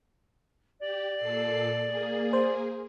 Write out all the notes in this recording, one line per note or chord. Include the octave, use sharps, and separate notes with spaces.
G4 D5
A#2 A4 C7
A#3 G#4
C5